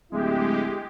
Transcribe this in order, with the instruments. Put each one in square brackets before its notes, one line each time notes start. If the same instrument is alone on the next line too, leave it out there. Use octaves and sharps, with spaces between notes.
[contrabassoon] D1 [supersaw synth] G#3 G4 [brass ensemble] E4 A4 E5